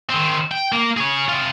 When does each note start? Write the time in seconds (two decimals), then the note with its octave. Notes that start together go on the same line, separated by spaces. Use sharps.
0.10 D#3 C4
0.52 G5
0.73 A#3
0.97 G#4 C#5
1.29 C3 F4